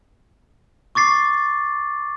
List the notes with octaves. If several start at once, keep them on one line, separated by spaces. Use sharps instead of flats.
C#6 D6 A6 C7